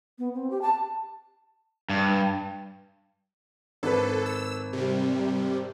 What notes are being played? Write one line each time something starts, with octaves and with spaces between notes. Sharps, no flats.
B3
C4
G4
A5
G2
G#1 A4 B4
E6
C3 G3